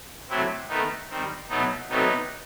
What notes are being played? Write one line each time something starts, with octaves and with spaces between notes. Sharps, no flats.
C3 F#3 A3 C4 E4
D#3 A3 B3 D#4
D#3 G3 C4
B2 F#3 A3 B3 D#4
C3 F#3 A3 B3 D#4